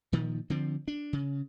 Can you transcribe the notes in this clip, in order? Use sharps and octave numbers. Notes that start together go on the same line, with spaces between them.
A#2 D#3 F3
D3 F3 C4
D4
C#3